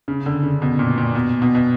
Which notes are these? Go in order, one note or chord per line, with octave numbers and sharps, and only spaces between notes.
C#3
D3
C#3
B2
A#2
A#2
B2
B2
B2